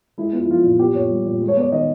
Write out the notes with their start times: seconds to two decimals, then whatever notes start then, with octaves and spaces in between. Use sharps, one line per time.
0.18 G#3 E4
0.33 B3 F4
0.42 E4
0.48 F3 F4
0.64 A#2
0.79 B3 G4
0.94 A#2 C#5
1.10 G3
1.26 A#2
1.41 G#3
1.48 C#5
1.56 B3 D5
1.72 D#3 D#5